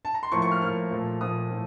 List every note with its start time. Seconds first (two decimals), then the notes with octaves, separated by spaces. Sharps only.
0.05 A5
0.14 A#5
0.23 C6
0.32 A2 F3 A#3 C#6
0.42 C#6
0.51 F6
0.61 A2 F3 A#3 F6
0.91 A#2 F3 A3
1.21 A#2 F3 A3 D#6
1.50 A2 F3 A3